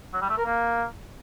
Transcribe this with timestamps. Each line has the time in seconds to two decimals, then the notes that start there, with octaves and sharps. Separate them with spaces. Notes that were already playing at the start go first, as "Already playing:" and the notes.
0.13 F#3
0.21 G3
0.30 A3
0.38 A#4
0.46 A#3